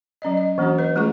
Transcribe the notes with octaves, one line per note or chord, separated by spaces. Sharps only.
F#3 C#4 D5 D#5
D#5
E3 A#3 C#4 D4 F#4
B4 D#5
G#3 A3 C#4 F4 G#4 C#6